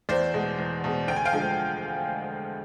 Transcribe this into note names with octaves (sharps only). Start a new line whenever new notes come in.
E2 C5 D5
B2 G#3
E2
B2 G#3
D2 G5
G#5
F5 G5
D3 F3 G#3